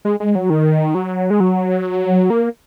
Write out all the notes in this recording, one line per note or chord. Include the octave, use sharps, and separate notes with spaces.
G#3
G#3
F#3
D#3
F#3
G#3
F#3
A#3